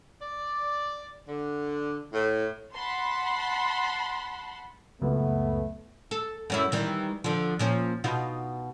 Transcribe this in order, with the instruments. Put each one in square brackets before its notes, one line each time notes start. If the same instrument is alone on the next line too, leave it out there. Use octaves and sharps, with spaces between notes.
[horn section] D5
D3
A2
[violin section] F#5 A5 B5 C6
[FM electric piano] C#2 F#2 A#2 [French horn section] A3 B3
[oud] A4
F#2 C#4 E4
D#3 E3 G3
D3 F3
A#2 F3 C#4
B2 D#4 F4